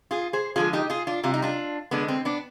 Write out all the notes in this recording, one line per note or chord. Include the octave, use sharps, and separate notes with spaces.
F4 G#4
G#4 C5
D3 F3 G#3 F4 G#4
D#4 G4
F4 G#4
D4 F4
C3 G3 F4
D#4
D4 F4
D3 G#3 B3 D4
C4
B3 D4